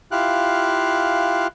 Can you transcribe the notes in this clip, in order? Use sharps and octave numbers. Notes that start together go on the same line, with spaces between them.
E4 F4 G4 F5 F#6